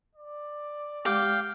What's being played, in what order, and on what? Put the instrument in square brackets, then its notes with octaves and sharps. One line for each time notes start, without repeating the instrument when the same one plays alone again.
[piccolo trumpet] D5
[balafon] G#3 G4 [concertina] F5 G5 [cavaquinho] D6